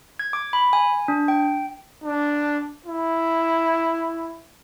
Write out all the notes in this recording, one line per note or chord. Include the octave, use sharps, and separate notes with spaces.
G#6
D6
B5
G#5
D4
G5
D4
E4